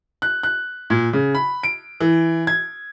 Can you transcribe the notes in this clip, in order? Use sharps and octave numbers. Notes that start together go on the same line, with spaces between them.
F#6
F#6
A#2
C#3
B5
D7
E3
G#6